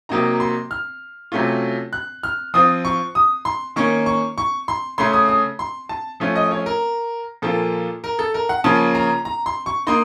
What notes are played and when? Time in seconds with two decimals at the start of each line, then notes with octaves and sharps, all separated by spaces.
0.09 C3 F#3 A#3 D#4 A#5
0.40 C6
0.71 F6
1.32 C3 F#3 A3 C#4 F4
1.93 F#6
2.23 F6
2.54 F3 C4 F4 D#6
2.85 C#6
3.15 D#6
3.45 C6
3.76 D#3 A#3 C#4 C#6
4.06 C#6
4.38 C#6
4.68 C6
4.98 C#3 A3 C#4 C6
5.13 D#6
5.28 D#6
5.59 C6
5.89 A5
6.20 F3 A3 C#4 F4
6.35 D#5
6.51 C#5
6.66 A#4
7.42 A#2 F3 A#3 F4 A4
8.04 A#4
8.19 A4
8.34 A#4
8.49 F#5
8.64 C#3 F3 A#3 C#4 F4 A5
8.95 A#5
9.25 A#5
9.46 C6
9.66 C#6
9.87 A#3 D#4 C6